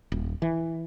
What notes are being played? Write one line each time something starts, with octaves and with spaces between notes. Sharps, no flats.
D#1
E3